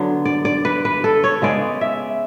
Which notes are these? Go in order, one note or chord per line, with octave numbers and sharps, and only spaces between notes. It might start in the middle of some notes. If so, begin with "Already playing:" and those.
Already playing: D3 F#3 B3
D5
D5
B4
B4
A4
C#5
C#3 G#3 B3 D5
E5